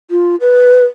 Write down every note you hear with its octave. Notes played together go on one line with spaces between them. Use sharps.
F4
B4